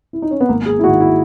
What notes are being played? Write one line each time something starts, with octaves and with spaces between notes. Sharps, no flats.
E4
D#4
C#4
B3
G#1 A#3
G#4
E4
G#2 D#3 F#4
E4